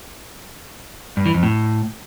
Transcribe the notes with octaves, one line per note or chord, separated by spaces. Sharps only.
G2
E3
F2
A2